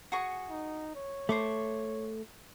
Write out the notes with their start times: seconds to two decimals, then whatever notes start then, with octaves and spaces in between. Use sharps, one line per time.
0.12 F#4 G#4 C#6
0.50 D#4
0.96 C#5
1.29 A3 C5 C#6 D6